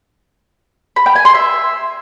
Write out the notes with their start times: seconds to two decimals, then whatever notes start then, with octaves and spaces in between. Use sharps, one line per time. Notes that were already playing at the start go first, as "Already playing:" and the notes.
0.96 B5
1.06 G5
1.15 G#5
1.25 C6
1.35 E5